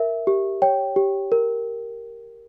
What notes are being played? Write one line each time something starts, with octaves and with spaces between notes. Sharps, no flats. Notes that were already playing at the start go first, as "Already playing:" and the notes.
Already playing: A#4 E5
G4
C#5 G5
G4
A#4